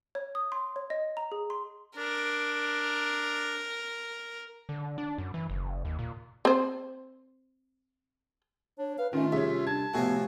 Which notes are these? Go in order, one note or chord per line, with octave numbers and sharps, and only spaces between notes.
C#5
D#6
C6
C#5
D#5
A#5
G#4
C6
D4 A#4
D3
D4
F#2
E3
F#1
D#2
A#2
C4 C5
D4 C#5
B4 F5
D#3 A3 C#4 F4
C2 C#4 G#4 E5
D4 A5 G#6
A2 C3 F3 B3 F#4 G#5